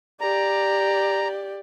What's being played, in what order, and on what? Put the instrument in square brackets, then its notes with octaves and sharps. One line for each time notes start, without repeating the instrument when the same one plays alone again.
[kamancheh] G4 D5 [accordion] A#5